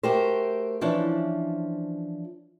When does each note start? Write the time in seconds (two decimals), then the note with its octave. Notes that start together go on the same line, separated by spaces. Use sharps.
0.03 A3 F#4 G4 A#4 C5
0.81 E3 F3 C#4 D4